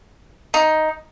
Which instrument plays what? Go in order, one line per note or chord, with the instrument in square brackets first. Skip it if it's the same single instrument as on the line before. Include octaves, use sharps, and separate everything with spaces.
[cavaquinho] D#4